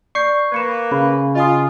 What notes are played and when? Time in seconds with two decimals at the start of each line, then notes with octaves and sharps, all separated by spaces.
0.15 D5 C#6 G6 C7
0.52 A#3 B4 G#6 C#7 E7
0.91 C#3 B5
1.35 F4 D#5 G#5 D#6